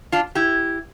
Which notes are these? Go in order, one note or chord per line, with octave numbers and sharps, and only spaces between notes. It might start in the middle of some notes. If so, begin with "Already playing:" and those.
D4 F4
E4 G4